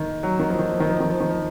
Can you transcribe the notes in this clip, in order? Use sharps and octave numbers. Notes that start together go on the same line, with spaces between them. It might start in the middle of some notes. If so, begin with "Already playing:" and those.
Already playing: D#3
F#3
D#3
F3
D#3
F3
D#3
F3
D#3
F3
D#3
F3